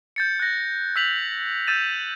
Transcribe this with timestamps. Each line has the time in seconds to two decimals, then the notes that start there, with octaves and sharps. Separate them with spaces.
0.16 G6 A6 C#7
0.40 F#6 A#6
0.96 E6 G6 B6 F7 F#7
1.67 E6 G6 A6 D#7 E7